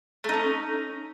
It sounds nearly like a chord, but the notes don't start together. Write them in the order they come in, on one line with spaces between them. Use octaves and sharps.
A3 D#4 C#4